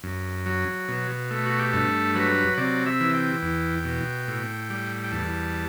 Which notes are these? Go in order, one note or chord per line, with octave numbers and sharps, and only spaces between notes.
F#2
F#3
B2
A3
F#4
G4
G2 A4
F#3 B4
C3 D5
E5
E3
G5
E2
B2
A2
G3
G5
E2 A5